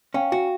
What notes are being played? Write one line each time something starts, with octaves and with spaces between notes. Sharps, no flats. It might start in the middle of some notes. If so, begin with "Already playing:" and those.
C#4 F5 G5
F#4